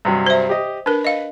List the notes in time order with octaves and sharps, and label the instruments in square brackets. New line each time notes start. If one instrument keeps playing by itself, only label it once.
[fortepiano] G2 C3 F#3
[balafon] C5 E5
[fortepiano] G4 D#5
[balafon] D4 A#4 [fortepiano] B4
[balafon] D#5 F5